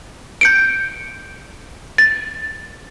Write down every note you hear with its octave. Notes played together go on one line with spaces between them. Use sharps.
G6 C#7 D7
A6